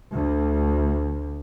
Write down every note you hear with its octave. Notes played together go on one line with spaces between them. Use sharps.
D2